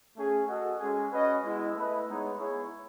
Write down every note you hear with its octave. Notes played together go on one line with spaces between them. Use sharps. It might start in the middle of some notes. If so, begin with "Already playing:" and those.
A3 C#4 G#4
F#4 A4 D#5 F#5
G#3 C#4 G#4
C#4 F#4 B4 D#5
G#3 B3 E4
A3 E4 B4 D#5
G#3 B3 D#4 G#4 C#5
B3 E4 G#4 C#5